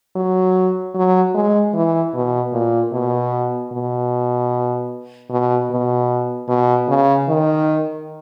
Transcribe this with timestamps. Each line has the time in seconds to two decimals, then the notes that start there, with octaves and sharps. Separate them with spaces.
0.16 F#3
0.94 F#3
1.34 G#3
1.74 E3
2.14 B2
2.53 A#2
2.93 B2
3.72 B2
5.30 B2
5.70 B2
6.48 B2
6.88 C#3
7.28 D#3